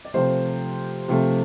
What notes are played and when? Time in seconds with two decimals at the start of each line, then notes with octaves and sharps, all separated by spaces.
0.05 D5
0.14 C3 F3 A3 C5
1.08 C3 F3 A3